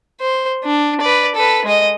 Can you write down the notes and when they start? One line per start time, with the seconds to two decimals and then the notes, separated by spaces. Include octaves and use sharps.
0.21 C5
0.65 D4
1.01 B4 D5
1.35 A4 B4
1.65 G#3 D#5